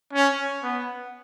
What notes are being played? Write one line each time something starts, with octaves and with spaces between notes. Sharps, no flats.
C#4
B3